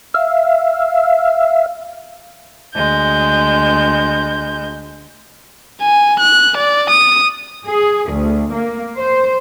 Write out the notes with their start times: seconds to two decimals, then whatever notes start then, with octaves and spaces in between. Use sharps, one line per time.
0.14 E5 F5
2.75 D2 G#3 G6
5.81 G#5
6.19 F#6
6.57 D5
6.90 D#6
7.67 G#4
8.13 D2
8.54 A#3
8.99 C5